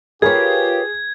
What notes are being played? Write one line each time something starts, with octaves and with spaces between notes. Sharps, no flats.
F4 G4 G#4 A#4 B4 C#5 G#6